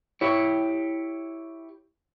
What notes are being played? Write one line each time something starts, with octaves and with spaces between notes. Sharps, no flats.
E4 G4 C#5